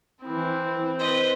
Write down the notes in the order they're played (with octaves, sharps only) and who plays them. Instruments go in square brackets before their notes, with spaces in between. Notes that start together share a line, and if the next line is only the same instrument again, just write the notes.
[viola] E3 E4 [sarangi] C4
[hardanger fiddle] B4 D#5 [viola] C5